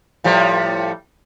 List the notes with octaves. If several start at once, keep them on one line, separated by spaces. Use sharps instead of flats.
A2 F3 G3